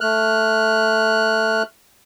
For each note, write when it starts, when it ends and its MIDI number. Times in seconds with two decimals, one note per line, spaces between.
0.01 1.63 57
0.01 1.63 89
0.01 1.63 90